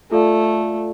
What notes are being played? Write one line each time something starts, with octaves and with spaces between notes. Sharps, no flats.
A3 F4 A4 D5 F5